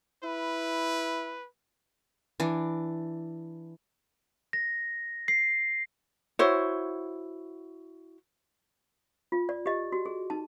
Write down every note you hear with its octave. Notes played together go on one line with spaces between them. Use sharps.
E4 B4
E3 D4
A#6
C7
E4 F#4 C5 C#5
F4
D5
G4 D#5
F#4
G#4
D#4 A5